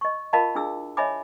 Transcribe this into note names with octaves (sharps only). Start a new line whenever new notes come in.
D#5 C#6
F4 A#4 D#5 F5 A5 B5
D4 E4 G#4 E6
C#5 D#5 E5 G#5 B5 D6